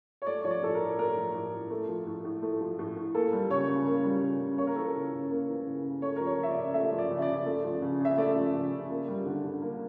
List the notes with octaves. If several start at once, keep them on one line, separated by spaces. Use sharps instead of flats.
C#5
A3 D5
F3 C#5
D5
A2 A4
A#4
A2
A3 A#4
F3
A2
A2
A3
F3
A2
A2
A3
F3
A2
A2
A#3 A4
G3
C#3 C#5
C#3
A#3
G3
C#3
C#3
A#3 C#5
A#4
E3 A4
A#4
C#3
C#3
A#3
E3
C#3
C#3
A3 C#5
F3 A#4
C#5
C#3
E5
D5
C#3
A3 E5
F3
D5
C#3
E5
D5
C#3
A3
F3
C#3
C#3 E5
A3 D5
F3
C#3
C#3
A#3
G3
D3
D3
A#3